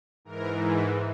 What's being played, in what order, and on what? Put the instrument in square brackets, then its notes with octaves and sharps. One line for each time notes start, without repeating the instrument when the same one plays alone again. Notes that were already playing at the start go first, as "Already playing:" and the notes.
[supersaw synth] G#2 E3 A#4